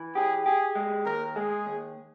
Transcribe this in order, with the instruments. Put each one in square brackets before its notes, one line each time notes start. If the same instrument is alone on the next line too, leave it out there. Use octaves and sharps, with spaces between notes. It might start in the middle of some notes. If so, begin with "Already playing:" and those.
Already playing: [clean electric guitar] E3
[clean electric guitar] G4 [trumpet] G#4
[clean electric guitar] G4 [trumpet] G#4
[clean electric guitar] G#3
[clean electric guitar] D#2 [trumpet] A#4
[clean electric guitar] G#3 [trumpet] G#4
[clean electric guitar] D#2